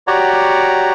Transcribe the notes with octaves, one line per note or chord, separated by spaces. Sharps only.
F#4 G4 C#5 D5 F#5 A#5